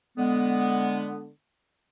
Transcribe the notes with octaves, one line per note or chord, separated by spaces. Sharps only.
D3 G#3 B3